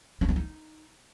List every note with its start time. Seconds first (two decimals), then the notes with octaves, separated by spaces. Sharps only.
0.21 C#4
0.29 B3
0.36 D#4